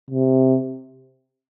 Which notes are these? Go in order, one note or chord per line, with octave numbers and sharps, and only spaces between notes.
C3